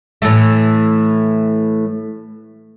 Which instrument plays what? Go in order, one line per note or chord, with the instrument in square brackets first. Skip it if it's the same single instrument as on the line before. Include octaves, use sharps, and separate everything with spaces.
[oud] A2 E3 A3